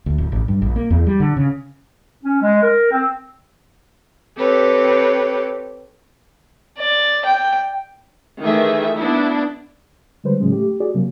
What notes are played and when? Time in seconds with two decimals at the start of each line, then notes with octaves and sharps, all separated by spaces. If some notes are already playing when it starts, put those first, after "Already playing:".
0.06 D2
0.18 D1
0.32 A1
0.48 G2
0.62 A#1
0.76 A#3
0.90 E2
1.07 G3
1.20 D3
1.37 C#3
2.24 C#4
2.42 G#3
2.62 A#4
2.91 C4
4.38 C4 G4 A4 B4 C#5
6.78 D5
7.25 G5
8.42 D#3 E3 A3 G#4 E5
8.96 B3 D4 E4
10.24 D3 G3 G#3 B4 C5
10.40 A2 C#3 E3 F#3 G#3 C#4
10.52 A3 G4
10.80 F#4 G#4 D5
10.94 C3 F#3 A#3